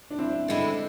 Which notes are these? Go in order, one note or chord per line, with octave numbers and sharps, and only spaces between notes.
D4
C4 E4
D3 G#3 C4 E4